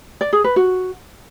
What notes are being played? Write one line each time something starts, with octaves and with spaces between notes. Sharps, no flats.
D5
G#4
B4
F#4